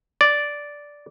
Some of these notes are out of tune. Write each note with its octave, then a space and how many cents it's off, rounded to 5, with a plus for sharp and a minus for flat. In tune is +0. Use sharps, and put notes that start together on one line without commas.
D5 -5